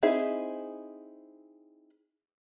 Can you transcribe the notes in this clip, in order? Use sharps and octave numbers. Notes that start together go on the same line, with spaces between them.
C4 D#4 E4 G#4 E5